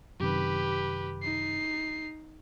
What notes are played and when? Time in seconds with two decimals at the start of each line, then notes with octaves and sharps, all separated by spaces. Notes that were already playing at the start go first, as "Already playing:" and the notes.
0.20 F#2 C3 D#3 G4 B4
1.22 D#4 C7